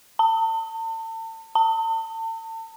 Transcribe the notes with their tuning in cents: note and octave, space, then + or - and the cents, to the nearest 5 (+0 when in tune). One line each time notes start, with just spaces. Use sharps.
A5 +40
A5 +40